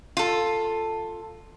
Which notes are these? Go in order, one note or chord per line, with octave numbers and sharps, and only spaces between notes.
F4 A4